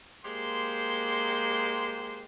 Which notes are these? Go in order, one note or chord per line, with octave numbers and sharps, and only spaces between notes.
G#3 A#3 G4 C5 C6